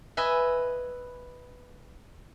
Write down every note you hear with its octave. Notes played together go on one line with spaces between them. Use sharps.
B4 D#5 E5 G#5